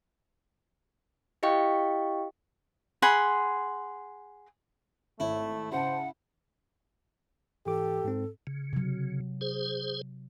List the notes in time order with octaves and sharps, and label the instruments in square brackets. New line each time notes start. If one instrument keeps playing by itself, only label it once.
[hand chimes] E4 G4 D#5 F5 G5 C#6
[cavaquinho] G#4 F#5 B5 C6
[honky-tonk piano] G#1 C#5 [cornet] A3 [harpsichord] E4
[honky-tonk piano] C#3 A5 [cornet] C5 [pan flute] F#5
[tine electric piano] G#2 E3 D6 [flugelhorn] G4 [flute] A4
[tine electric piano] G#2 C4
[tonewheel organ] C#3
[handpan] C3 F#3
[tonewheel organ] G#4 C5